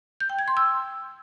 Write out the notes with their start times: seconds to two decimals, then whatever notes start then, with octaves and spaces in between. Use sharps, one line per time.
0.20 G6
0.30 G5
0.39 G#6
0.48 C6
0.57 E6